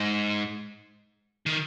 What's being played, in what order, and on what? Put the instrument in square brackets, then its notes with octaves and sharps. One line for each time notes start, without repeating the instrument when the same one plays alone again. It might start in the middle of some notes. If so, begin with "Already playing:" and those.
Already playing: [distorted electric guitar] G#2
D#3